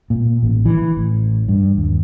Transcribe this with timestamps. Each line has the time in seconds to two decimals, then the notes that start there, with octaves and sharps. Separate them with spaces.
0.10 A#2
0.43 A1
0.65 E3
0.97 A1
1.48 G2
1.77 D#2